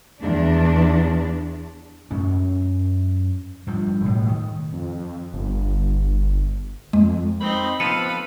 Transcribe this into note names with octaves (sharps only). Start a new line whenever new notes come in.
E2 D4
F#2 C#4
G2 F3
E1 A2
D#3
F2
G1
F2 G#3
C4 D#4 B5
F3 B3 A4 B4 F5 C#7 D#7